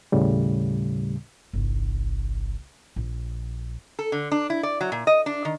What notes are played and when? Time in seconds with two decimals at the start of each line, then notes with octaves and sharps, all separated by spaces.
0.12 D#2 A2 C#3 G3
1.53 G1 C2
2.96 A#1
3.99 A4
4.12 D3
4.32 D4
4.50 E4
4.63 D5
4.81 F#3
4.92 A#2
5.07 D#5
5.26 D4
5.45 D#3